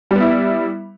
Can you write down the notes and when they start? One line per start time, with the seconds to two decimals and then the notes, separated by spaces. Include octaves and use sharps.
0.11 G3
0.16 B3
0.21 E4